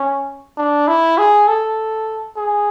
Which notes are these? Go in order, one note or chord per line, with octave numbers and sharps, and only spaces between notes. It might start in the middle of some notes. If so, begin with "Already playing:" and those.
Already playing: C#4
D4
E4
G#4
A4
G#4